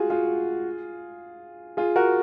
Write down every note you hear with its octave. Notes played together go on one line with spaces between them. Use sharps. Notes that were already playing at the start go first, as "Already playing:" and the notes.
Already playing: F4 F#4 G#4
F4 G#4
F4 G#4
F#4 A#4